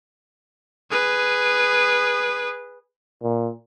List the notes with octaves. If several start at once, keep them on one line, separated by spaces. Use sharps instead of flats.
G#4 B4
A#2